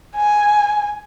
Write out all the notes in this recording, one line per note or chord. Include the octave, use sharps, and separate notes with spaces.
G#5